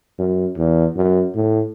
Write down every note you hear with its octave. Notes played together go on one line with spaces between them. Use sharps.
F#2
E2
F#2
A2